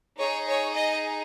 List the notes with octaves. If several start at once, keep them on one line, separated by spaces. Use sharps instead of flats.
D#4 G#4 C#5
C#5
D#5